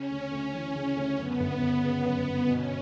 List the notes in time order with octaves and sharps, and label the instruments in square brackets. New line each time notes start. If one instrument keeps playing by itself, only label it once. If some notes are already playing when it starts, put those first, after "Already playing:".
Already playing: [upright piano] C#3 [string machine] C#4
[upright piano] D2
D2
E3
C#3
D2
[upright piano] F#2 [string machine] B3
[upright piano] G1
G1
C#3
F#2
G1
[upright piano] B2 [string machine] C#4